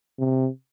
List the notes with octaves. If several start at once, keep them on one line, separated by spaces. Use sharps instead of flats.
C3